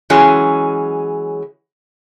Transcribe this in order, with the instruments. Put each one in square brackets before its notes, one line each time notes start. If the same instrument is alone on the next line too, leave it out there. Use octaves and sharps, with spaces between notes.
[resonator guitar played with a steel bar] E3 F#3 G#3 C#4 G#4